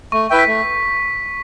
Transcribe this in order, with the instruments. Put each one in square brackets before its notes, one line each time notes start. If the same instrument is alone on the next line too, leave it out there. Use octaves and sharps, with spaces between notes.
[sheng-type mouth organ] A3 [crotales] C#6
[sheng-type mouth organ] E4 B4 E5 G5
[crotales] B6
[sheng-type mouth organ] A3